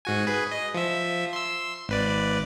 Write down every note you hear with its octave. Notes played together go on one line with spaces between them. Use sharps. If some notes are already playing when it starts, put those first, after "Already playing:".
G#2 F#4 G#5
G#4 B4
D#5
F3 E5
C6 E6
G#1 B4 D5